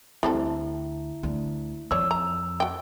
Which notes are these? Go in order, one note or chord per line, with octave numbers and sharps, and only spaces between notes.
D2 G3 C4 E4 A4
D2
F2 C#5 D5 E6
A#5
F#4 G5